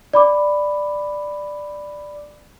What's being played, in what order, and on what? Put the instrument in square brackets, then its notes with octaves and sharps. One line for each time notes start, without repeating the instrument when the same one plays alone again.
[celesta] D5 B5 D6